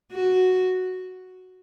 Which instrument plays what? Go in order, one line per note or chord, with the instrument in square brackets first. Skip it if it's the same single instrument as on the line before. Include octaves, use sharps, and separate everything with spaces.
[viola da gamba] F#4